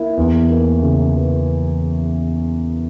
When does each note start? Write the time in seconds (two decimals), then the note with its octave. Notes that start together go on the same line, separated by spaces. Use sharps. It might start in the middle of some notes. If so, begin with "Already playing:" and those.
Already playing: A#3 E4
0.17 E2
0.50 A#3
0.82 C#3
1.15 E3